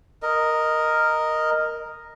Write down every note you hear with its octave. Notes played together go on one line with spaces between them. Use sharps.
A#4 D#5